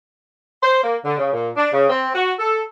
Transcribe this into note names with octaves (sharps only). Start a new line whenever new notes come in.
C5
A#3
D3
C#3
A#2
D4
C#3
C4
F#4
A4